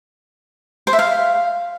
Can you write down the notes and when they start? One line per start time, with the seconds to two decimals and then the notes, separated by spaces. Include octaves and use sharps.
0.87 C5
0.93 E5
0.99 F5